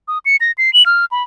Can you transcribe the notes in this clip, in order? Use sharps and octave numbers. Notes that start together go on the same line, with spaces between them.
D#6
C#7
A#6
C7
F#7
F6
B5